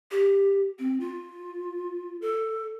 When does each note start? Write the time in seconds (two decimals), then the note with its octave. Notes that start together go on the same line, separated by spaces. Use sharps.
0.11 G4
0.79 C4
1.00 F4
2.22 A4